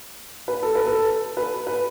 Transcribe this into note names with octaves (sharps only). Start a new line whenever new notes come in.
B4
A4
B4
A4
B4
B4